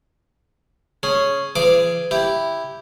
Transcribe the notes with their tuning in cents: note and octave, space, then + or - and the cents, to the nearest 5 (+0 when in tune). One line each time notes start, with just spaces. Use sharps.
C#4 +0 G#4 +0
E3 +45 G#4 +0 D6 +0
E4 +0 G4 +0